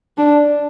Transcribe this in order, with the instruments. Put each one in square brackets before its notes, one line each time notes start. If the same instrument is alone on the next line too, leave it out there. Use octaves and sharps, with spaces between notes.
[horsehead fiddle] D4